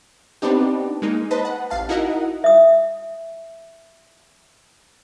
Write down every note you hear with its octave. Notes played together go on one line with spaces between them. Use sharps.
B3 C4 D4 D#4 G4
G#3 A#3 D#4
B4 C5 D#5 A5
F#5
A1 F5 A5
D#4 E4 F#4 A#4 D#5 F#5
E5 D#6